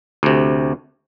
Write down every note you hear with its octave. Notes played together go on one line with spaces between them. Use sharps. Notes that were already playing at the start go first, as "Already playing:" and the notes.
D2 C3